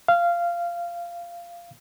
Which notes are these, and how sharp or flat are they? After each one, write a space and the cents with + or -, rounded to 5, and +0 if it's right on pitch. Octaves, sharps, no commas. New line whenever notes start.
F5 -15